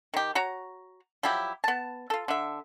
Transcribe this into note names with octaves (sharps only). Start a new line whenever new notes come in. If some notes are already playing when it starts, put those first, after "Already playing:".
D#3 G4
F#4 C#5 A#5
F3 F#3 E4 G4
B3 A5
F4 A4
D3 E5